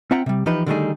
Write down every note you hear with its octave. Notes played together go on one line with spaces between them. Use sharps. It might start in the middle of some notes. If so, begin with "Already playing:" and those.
C4 F4 E5 F#5 G5 A#5
C3 G3
E3 F3 D#4 G4 B4
D3 D#3 G3 A3 D#4 G#4